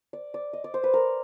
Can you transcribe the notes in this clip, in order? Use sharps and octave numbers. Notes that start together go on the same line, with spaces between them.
D5
D5
D#5
D5
C5
B4
A#4